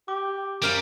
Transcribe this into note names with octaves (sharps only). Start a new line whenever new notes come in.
G4 D6
F#2 G3 C5 F5 A#5 F6 D7